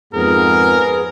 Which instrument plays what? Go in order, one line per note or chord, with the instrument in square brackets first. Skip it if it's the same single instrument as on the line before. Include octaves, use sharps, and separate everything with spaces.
[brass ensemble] F2 G#2 [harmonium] B3 G#4 [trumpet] A#4